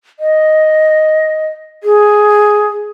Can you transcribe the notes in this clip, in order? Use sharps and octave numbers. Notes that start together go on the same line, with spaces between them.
D#5
G#4